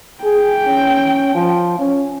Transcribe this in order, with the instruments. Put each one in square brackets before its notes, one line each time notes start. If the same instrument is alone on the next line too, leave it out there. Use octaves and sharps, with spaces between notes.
[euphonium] G#4 [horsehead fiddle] G5
[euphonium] C#4
F3
C#4